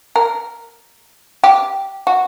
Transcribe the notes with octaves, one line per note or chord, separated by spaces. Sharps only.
A#4
G4
F#4